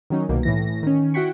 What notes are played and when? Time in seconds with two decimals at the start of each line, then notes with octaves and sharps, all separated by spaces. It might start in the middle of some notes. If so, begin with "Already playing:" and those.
0.10 D#3 F#3 C#4 D#4
0.29 C2 B2 D#3 A#3
0.43 A2 E3 A#6
0.83 D#3 C#4
1.14 E4 F#4 F#5 G5 B5 C#6